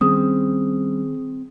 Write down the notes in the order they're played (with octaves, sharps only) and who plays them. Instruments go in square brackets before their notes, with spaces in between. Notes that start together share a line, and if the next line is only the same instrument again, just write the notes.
[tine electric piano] D#3 G#4 [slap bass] G3 C#4 [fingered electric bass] C4 [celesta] D#6